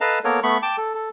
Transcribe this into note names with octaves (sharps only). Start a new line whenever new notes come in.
A4 B4 D#5 F5 A5 A#5
A#3 B3 A4 A#4 C#5
A3 B3 B5 C#6
G5 A5 D6
A4
A4